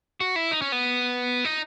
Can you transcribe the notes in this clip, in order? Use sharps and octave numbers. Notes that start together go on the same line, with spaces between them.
F#4
E4
D#4
C#4
B3
D#4